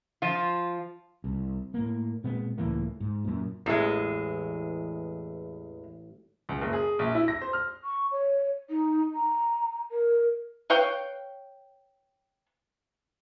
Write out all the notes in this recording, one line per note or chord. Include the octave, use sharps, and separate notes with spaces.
F3 F4
C2
A2 A#3
A#2 G#3 B3 C4
C#2 A2 E3 A#3
G#2
F#2 A#2
A1 E2 G#3
C#2
F#1
G#4
A#1
E4
A#6
C5
F6
C#6
C#5
D#4
A#5
A#4
B4 C#5 F5 G5